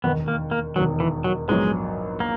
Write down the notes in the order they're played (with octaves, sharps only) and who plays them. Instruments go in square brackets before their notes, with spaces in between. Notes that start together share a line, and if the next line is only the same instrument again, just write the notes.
[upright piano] E1 D#2 D#3 [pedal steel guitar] B3
[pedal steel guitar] A#3
A#3
[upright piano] E1 D#2 D#3 [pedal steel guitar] F#3
[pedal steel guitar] E3
F#3
[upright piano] A#1 G#2 F#3 B3 [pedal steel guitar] G#3
[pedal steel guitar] A#3